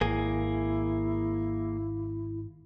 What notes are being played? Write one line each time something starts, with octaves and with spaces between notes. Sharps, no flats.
G#1 A#3 E4 G#4